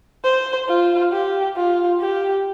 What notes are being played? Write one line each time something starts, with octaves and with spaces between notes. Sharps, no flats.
C5
F4
G4
F4
G4